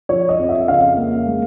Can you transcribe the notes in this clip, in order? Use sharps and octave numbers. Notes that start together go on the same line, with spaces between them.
F3 C#5
D#5
F2
E5
C#3 F5
A#3
G#3